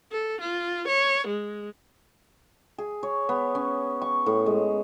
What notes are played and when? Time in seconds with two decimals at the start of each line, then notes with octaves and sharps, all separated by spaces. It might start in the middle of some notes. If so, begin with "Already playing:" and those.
0.11 A4
0.41 F4
0.88 C#5
1.27 G#3
2.78 G#4
3.03 C#5
3.29 B3
3.55 C#4
4.02 C#6
4.26 A2
4.46 G#3